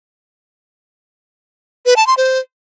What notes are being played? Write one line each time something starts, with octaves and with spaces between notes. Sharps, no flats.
B4
A5
C6
C5